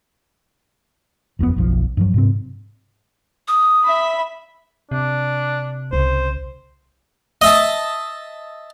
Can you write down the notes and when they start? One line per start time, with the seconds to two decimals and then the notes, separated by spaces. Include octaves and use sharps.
1.39 F#1 F2 A#2 B3
1.56 F#1 B1 F3
1.97 G2 F3 F#3
2.14 G#2 C3 C4
3.48 D#6
3.85 E5 B5
4.91 C3 D4
5.93 C2 C#3 C5
7.41 D#5 E5 A5